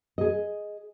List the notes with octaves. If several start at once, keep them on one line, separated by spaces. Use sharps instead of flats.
G#4 D#5